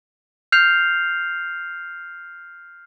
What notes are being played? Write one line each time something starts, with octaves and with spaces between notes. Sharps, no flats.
F6 G6 C7 F7